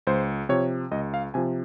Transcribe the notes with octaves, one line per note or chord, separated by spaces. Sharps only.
C#2 C5
C3 F3 C#5
C#2 D#5
F5
C3 F3 G#5